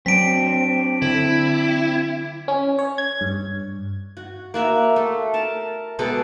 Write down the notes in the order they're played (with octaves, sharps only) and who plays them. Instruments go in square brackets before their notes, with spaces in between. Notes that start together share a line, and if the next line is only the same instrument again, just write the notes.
[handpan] F#3 [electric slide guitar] C4 D4 [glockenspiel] B6 D7
[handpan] D3 [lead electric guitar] E4
[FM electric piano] C#4
C#5
G#6
G2
[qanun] F#4
A#3 F#4 E5
A3
A#4 A5
B2 G#3 A4 D6